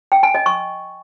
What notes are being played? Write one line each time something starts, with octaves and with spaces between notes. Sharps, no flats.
G5
G#5
D#5
C#6